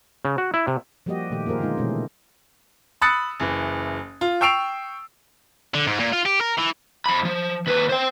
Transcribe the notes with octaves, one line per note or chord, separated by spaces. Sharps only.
C#3
F#4
E4
C3
F3 G3 A#3 F#4 G4 D#5
A#2 D#3 A3 G4
A#3 F4 G#4 A#4 C5
D3 G#3 B3 D#4 F4
B2 E3 G#3 A3 C#4
B5 D#6 E6 F#6 A6 C#7
F#1 E3
F4
G5 C#6 E6 C7 D7 F7
D3
G#2
A#2
F4
G4
A#4
E3
F2 B5
F3
D#2 B4
C5 G5